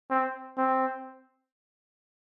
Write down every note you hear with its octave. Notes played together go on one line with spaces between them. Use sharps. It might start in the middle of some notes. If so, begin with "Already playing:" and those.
C4
C4